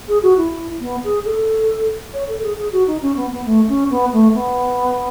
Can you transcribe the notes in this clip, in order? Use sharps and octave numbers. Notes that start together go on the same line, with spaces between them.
G#4
F#4
E4
B3
G#4
A4
C#5
A4
G#4
G#4
F#4
D#4
C#4
B3
B3
A3
C#4
B3
A3
B3